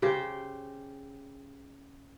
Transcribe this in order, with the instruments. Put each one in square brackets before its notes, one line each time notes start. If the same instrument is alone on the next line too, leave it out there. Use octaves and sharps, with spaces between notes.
[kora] C#3 G4 C5